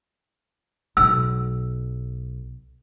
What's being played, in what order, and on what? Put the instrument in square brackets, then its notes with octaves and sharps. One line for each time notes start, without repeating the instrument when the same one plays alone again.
[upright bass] B1 [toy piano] E6